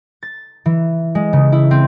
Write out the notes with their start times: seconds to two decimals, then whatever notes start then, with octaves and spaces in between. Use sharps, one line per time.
0.23 A6
0.66 E3
1.15 G#3
1.33 C#3
1.52 E4
1.71 C4